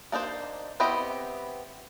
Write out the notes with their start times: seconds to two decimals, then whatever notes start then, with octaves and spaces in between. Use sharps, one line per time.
0.12 A#3 D4 D#4 C5
0.80 B3 C4 E4 G4 D#5